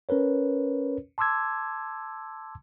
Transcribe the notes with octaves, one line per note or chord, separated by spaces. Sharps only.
C#4 A#4 B4 C#5
A5 C6 D6 E6 G#6